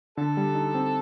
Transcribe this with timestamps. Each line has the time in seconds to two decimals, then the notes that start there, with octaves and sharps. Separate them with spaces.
0.17 D3 A4
0.37 G3
0.55 D#4
0.75 C4